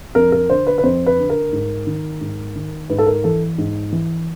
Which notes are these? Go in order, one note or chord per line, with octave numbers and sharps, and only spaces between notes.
F2 A#4
A#4
D3 C5
B4
B4
F2 C5
B4
D3
A#4
G#2
D#3
G#2
D#3
G#2 B4
A4
A#4
E3 A4
G#2
E3